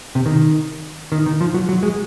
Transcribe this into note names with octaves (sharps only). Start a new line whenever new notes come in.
C3
D#3
D#3
D#3
F3
F#3
F#3
G#3